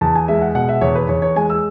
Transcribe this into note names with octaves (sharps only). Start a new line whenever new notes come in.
E2 A5
G#5
G#3 E5
F#5
B2 F#5
E5
E2 C#5
B4
E2 C#5
C#5
G#3 G#5
E6